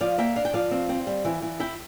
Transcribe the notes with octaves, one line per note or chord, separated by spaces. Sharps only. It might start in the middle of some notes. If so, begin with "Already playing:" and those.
F3 D5 F5
A#3 E5 G5
D4 F5
G5
F3 D5 F5
C4
C4
G3
E3
E3
E4 E5 G5